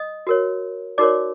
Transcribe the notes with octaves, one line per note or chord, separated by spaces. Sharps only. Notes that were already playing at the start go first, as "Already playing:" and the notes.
Already playing: D#5 D#6
F#4 A#4 C#5
D#4 F#4 A#4 C#5 D5 D6